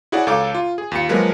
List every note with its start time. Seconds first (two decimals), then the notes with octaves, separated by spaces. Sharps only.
0.12 E4 F#4 G#4 C#5 D5 F#5
0.27 C#2 A4 C#5 F5 D6
0.54 F4
0.78 G#4
0.92 D#2 F4 C#7
1.09 F3 F#3 G#3 A#3 A#4 B4